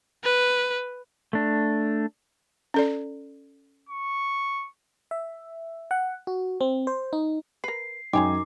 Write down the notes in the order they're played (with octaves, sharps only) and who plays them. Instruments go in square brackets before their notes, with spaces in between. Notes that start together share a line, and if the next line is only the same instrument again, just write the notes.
[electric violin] B4
[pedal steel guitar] A3 D4
[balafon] C#4 A4 D5
[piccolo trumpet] C#6
[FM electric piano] E5
F#5
F#4
C4
C5
D#4
[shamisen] A#4 B4 [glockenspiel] C7
[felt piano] F#2 G#5 [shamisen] G#3 C#5 G5 [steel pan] D#4 [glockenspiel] D6